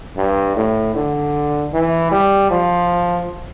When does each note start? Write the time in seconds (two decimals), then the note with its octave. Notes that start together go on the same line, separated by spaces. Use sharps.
0.17 G2
0.56 A2
0.95 D3
1.73 E3
2.12 G3
2.51 F3